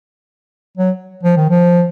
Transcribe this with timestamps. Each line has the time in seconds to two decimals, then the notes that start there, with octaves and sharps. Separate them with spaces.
0.77 F#3
1.23 F3
1.36 D#3
1.50 F3